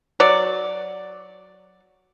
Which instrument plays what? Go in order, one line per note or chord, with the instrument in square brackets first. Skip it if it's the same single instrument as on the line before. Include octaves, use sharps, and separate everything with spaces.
[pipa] F#3 D5